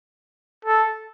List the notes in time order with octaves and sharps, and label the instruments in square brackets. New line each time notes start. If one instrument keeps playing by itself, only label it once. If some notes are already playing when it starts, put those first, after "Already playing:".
[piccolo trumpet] A4